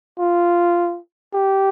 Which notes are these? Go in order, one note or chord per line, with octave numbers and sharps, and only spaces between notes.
F4
G4